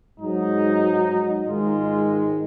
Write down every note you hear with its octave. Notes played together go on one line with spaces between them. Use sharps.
G#2 F#3 D#4
G#2 D#3 G#3 F4